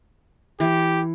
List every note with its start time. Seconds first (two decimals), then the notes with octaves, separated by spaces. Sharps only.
0.60 E3 G4